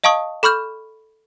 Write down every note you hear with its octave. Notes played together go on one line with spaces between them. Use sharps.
D#5 F5 A5 C#6 D#6
A4 B5 C#6 F6 G6